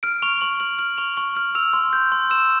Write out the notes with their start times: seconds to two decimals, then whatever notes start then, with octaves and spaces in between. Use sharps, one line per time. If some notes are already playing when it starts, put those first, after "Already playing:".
0.03 F6 D7
0.22 C#6 F7
0.41 C#6 F#7
0.60 F6 F#7
0.79 F6 F#7
0.97 C#6 F7
1.17 C#6 F#7
1.35 F6 F#7
1.55 E6 F7
1.73 C6
1.93 G6
2.12 C6
2.30 E6 E7